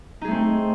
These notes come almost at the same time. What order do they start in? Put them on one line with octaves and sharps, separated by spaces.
D#4 G#4 A3 C4